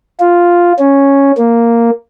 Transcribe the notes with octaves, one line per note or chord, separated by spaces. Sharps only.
F4
C#4
A#3